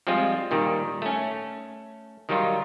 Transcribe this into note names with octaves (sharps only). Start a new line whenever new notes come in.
F3 G3 G#3 C4 F4
A#2 D#3 G3
A3 C#4
D#3 F#3 G3 D#4 F4